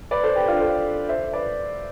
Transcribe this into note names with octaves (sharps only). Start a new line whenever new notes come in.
B4 D5
A4 C5
G4 B4
D4 F4
A4 C5
C5 E5
B4 D5